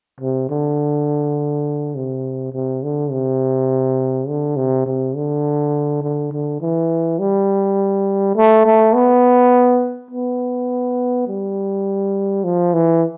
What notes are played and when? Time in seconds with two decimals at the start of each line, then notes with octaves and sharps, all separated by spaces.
0.20 C3
0.49 D3
1.95 C3
2.53 C3
2.83 D3
3.11 C3
4.28 D3
4.57 C3
4.86 C3
5.15 D3
6.02 D3
6.32 D3
6.61 E3
7.19 G3
8.36 A3
8.66 A3
8.95 B3
10.11 B3
11.28 G3
12.44 F3
12.74 E3